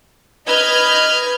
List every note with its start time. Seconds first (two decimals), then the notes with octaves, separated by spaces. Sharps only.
0.47 B4 D#5 F6 G6 G#6